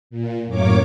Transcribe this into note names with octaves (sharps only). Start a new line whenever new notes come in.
A#2
F#2 A2 A#3 C#5 D6